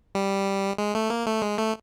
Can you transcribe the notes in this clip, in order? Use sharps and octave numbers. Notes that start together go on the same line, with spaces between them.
G3
G#3
A3
A#3
A3
G#3
A3